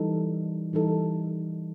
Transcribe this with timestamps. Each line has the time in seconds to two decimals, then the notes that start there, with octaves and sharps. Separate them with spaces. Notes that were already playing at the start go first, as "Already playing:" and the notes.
Already playing: E3 G3 D#4 A4
0.73 E3 G3 D#4 A4